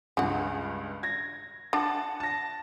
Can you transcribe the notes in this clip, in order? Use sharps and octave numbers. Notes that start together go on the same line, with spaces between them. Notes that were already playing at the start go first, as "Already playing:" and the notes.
C#2 G2 C#3 F#5
G#6 A#6
D4 F#5 A5 A6
A5 A#6